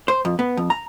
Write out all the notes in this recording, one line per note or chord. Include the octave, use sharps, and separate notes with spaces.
C5
F2
B3
F2
A#5